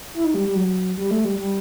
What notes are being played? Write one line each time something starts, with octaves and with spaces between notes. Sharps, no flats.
E4
D#4
G3
G3
F#3
G3
A3
G3
G3